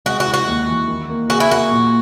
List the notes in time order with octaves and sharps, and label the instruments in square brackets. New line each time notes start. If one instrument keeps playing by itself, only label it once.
[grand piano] G#3 [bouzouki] F#4
[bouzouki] F#4
[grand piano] E4
[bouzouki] F#4
[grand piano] D#2
E3
D#3
A#3
[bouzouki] F#4 [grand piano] G#4
[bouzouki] E4
[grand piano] A#3 [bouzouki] F#4
[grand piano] A#2